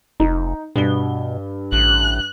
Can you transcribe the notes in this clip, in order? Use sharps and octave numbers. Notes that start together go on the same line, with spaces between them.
F1 D#4
G2 B2 G7
A1 F#6